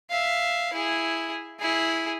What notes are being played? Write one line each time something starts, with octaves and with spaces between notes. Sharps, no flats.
E5 F5
E4 G#4
E4 G#4